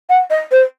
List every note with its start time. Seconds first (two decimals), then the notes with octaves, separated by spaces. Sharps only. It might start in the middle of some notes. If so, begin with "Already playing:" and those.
0.09 F#5
0.30 D#5
0.51 C5